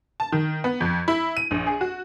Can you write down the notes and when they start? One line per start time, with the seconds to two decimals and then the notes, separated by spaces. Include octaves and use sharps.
0.20 A5
0.32 D#3
0.64 B3
0.80 F2
1.08 E4
1.37 D#7
1.51 A#1
1.67 G#4
1.81 F#4